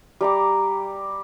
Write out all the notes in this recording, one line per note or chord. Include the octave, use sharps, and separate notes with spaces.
G3 A#5 D6